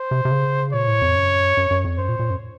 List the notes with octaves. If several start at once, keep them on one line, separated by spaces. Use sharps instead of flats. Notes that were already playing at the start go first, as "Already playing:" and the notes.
Already playing: C5
C3
C3
C#3
A#2 C#5
A2
F2
F#2
F#2
F#2
F2
F#2 C5
A#2
A#2
F#2